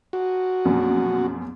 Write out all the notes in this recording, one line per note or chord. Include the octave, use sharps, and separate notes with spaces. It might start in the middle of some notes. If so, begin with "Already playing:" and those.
F#4
A#1 F#2 B2